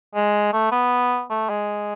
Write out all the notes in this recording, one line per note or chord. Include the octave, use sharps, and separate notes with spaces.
G#3
A3
B3
A3
G#3